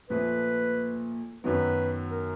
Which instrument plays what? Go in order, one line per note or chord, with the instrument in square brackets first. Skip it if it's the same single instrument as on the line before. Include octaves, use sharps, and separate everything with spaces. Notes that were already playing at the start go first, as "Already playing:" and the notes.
[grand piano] A#2 F3 A3 [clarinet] B4
[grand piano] F#2 D#3 F#3 B3 [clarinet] B4
[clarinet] A#4